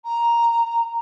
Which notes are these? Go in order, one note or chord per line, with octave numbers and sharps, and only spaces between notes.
A#5